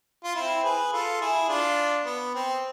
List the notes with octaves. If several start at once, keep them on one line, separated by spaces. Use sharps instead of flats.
F4
C4 E4
G#4 B4
F4 A4
E4 G#4
D4 F4
B3
C4